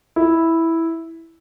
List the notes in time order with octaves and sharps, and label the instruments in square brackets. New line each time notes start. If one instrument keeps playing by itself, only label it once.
[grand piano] E4